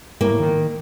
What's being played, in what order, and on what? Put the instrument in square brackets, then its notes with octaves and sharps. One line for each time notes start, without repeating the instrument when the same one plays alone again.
[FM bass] A2 [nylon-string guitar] A#3
[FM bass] D#3